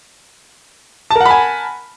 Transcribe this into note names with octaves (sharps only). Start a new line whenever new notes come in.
A#4 F#5 G#5 A5 B5